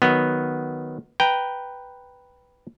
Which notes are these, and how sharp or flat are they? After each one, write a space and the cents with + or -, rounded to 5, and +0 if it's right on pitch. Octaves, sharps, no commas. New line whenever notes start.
D#3 +0 F#3 +0 B3 +0
B4 +0 G5 +0 A#5 +0